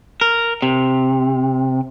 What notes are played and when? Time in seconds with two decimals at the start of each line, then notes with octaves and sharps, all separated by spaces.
0.21 A#4
0.62 C3